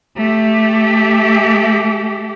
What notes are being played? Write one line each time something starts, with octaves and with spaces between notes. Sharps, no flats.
A3 G4